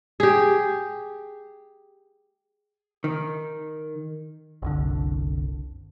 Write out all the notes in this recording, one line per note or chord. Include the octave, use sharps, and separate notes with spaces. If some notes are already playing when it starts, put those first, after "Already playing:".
G4 G#4
D#3
F#1 C2 D3